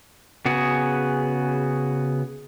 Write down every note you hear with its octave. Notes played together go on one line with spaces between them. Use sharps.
C#3 B3 F#4 G#4